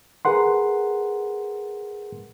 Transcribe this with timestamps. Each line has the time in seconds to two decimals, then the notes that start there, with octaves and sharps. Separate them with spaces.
0.25 G#4 A#4 B4 F#5 C6